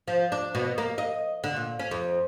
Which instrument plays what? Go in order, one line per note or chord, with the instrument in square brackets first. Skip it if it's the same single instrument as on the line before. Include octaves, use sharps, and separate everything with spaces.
[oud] F3
D4
B2
A#3
D#5
D3
A#2
C#4
F2